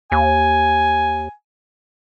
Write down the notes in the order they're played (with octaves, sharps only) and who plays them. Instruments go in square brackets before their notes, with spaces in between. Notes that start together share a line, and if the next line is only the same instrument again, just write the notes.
[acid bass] D#2 [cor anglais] G#5